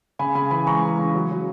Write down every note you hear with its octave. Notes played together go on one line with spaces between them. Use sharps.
C#3 G#5 B5
C#3 G#5 B5
E3 G#5 B5
G#3 A#5 C#6
E3
C#3
F#3
F#3